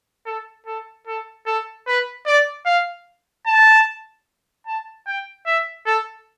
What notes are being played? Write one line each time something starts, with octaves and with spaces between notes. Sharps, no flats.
A4
A4
A4
A4
B4
D5
F5
A5
A5
G5
E5
A4